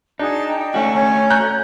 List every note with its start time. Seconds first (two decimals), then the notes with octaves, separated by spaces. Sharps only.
0.19 D4 D#4 F#4 G#4 A5
0.48 G5
0.74 A3 C#4 F#4
0.94 C#4 C#5
1.30 A#5 F#6 G6